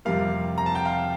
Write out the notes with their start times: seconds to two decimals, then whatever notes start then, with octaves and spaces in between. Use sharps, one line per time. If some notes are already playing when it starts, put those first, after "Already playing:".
0.05 F2 C3 G3 A#3 F5
0.58 A#5
0.66 A5
0.75 G5
0.85 F5